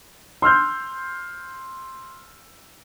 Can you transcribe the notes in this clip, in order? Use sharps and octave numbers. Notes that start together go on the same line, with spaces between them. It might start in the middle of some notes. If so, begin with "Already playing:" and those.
C6 E6 F6 G6